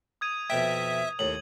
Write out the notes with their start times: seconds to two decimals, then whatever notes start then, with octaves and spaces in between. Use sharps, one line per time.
0.21 D#6 G#6 D#7
0.50 F2 B2 E5 G5
1.19 D#2 A2 F#7